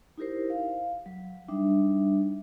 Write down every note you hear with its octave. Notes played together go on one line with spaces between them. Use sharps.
D#4 E4 G4 A#4 C5
F5
F#3
G3 D4 D#4 E5